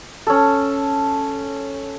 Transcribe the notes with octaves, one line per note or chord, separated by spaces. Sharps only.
C#4 A4